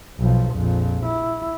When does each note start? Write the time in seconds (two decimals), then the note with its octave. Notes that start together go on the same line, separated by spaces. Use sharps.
0.19 B1 F3
0.54 A#1 F2
1.05 E4